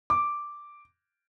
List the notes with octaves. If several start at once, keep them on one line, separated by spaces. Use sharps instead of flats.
D6